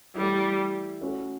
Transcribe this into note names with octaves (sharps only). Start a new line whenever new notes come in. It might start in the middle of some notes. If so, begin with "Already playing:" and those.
E3 G3 A3 E4
A3 C#4 F#4